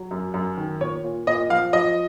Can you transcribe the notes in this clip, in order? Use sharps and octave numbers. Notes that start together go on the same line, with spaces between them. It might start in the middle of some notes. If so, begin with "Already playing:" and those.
Already playing: F#3
F#2
F#2
D#3
A#2 C#5
A#2
A#2 D#5
F3 F5
F3 D#5